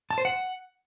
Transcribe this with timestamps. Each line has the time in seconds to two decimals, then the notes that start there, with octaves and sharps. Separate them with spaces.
0.10 A5
0.18 C5
0.25 F#5